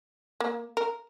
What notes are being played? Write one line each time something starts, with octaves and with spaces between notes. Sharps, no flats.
A#3
A#4